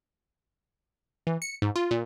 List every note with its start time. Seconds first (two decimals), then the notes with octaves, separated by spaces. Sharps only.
1.27 E3
1.42 C#7
1.62 G#2
1.76 F4
1.91 A#2